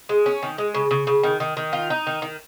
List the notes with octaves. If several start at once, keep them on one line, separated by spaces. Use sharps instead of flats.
G#3
C#4
D#3
G#3
C#3
C#3
C#3
D#3
D#3
D#3
F4
D#4
D#3
D#3